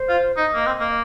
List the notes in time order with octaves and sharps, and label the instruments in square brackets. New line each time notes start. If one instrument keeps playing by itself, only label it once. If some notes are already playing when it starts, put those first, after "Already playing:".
Already playing: [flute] C5
[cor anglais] F4
[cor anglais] D#4 [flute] D#5
[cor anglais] A#3
C4
A#3